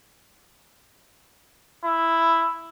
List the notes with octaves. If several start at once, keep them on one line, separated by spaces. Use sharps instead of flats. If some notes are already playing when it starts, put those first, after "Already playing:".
E4